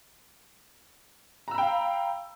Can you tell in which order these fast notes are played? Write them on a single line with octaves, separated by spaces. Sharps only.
A#5 E6 B5 G5 F5